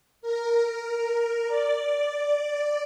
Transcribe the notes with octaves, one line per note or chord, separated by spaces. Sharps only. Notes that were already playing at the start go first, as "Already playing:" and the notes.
A#4
D5